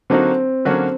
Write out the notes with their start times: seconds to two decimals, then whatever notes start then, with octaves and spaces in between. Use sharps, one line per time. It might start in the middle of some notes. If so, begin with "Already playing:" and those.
0.10 D3 F#3 A#3 C4 D#4 F#4
0.65 D3 F#3 A#3 C#4 F#4